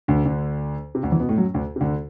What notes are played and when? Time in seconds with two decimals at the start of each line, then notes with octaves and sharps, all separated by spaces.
0.08 D2 D3
0.25 D2 D3
0.95 C3
1.03 D2 D3
1.11 E2 E3
1.20 B2 B3
1.29 A2 A3
1.38 F#2 F#3
1.54 D2 D3
1.76 C3
1.81 D2 D3